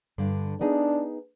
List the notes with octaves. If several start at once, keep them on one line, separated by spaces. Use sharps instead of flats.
G2 D3
B3 D4 D#4 G#4